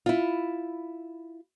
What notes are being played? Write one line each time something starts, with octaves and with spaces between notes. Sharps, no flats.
E4 F4